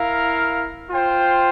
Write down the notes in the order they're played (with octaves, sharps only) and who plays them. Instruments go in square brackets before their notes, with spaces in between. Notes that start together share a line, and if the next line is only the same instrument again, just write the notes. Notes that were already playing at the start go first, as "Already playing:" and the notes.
Already playing: [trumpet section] E4 A#4 F5
F4 C5 G5